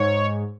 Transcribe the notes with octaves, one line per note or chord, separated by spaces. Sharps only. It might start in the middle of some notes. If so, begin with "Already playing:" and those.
Already playing: G#2 C#5